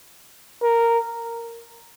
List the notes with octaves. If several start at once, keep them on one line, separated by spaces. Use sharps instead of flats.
A#4